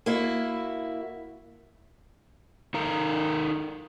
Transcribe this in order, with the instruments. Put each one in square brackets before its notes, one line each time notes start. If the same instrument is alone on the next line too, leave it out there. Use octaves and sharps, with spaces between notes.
[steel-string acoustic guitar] A#3 E4 F#4
[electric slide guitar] D#4 A4 A#4 F5 A#5